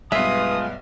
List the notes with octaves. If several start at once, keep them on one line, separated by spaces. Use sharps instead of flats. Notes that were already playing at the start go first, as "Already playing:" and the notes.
B1 G2 G#3 B3 F4 B4 E5 D#6